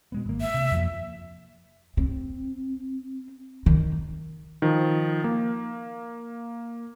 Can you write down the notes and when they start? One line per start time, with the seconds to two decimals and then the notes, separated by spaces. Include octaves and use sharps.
0.12 B2 G#3 B3
0.26 G#1 A#3
0.41 E5
0.54 C3
0.72 F2 F3 A#3
1.97 C4
3.66 D#3
4.62 D#3 F3
5.24 A#3